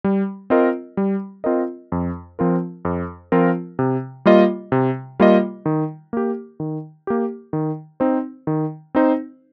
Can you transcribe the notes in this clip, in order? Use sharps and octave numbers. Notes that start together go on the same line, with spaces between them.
G3
C4 F4 A#4 D#5
G3
C4 F4 A#4 D#5
F2
F3 C4 F4 A#4
F2
F3 C4 F4 A#4
C3
G3 A#3 F4 D#5
C3
G3 A#3 F4 D#5
D#3
A#3 G4
D#3
A#3 G4
D#3
C4 D#4 C5
D#3
C4 D#4 C5